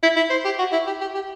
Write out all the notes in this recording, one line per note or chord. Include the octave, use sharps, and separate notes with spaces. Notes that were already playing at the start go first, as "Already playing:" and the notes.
E4
E4
C5
G4
F#4
E4
G4
G4
G4